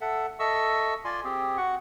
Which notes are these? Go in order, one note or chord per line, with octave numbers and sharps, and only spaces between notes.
A4 E5 F#5
A4 D#5 E5 C#6 E6
F4 D5 G#5 C6
C4 G4 G#4
F#4 F#5 C#6